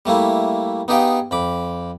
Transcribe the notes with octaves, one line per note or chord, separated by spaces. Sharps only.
G3 A3 A#3 E4
B3 D#4 G4 G#4 F5 G5
F2 B5 D6